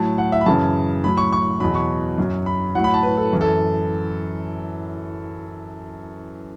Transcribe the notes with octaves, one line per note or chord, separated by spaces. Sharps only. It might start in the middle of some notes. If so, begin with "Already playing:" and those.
Already playing: A2 F#3 A5
F#5
E5
B5
F#2 C#3 E3 A5
A2 F#3 B5
C#6
C#6
E2 B2 F#3 B5
C#6
F#2 F#3
B5
A2 F#3 F#5
B5
A5
B4
A4
F#2 E3
A4